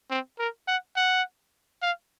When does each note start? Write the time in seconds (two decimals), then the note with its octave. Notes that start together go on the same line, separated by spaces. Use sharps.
0.11 C4
0.39 A#4
0.68 F#5
0.96 F#5
1.82 F5